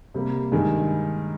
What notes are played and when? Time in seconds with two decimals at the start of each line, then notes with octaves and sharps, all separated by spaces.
0.14 C3 G3 A#3
0.52 G2 D#3 G#3